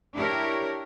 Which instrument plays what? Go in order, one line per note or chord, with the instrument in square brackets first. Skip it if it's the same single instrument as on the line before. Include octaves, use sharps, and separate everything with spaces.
[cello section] D4 E4 G4 A#4 C#5